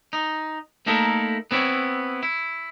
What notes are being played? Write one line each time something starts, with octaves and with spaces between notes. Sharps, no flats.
D#4
A3 A#3 D#4 E4 A4 A#4
B3 C4 E4 C#5
E4